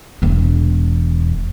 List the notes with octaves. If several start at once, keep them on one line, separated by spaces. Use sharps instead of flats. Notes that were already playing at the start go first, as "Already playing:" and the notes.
E1 E2